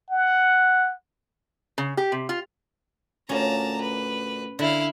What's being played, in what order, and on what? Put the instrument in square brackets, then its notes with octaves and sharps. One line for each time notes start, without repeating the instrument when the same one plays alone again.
[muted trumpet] F#5
[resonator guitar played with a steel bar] C#3
G4
C3
F4
[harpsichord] D2 A#2 [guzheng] C#4 F4 [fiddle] A5 A#5
[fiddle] B4
[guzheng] D3 [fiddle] E4 F5